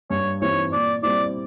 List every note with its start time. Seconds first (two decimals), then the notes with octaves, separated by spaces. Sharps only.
0.10 G2 C#5
0.42 E3 G3 C4 D#4 C#5
0.72 A#2 D5
1.03 G3 C4 E4 D5